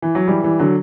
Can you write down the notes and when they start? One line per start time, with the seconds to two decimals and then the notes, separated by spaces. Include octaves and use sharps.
0.02 E3
0.15 F#3
0.28 E3 G3
0.43 E3 G3
0.59 D3 F#3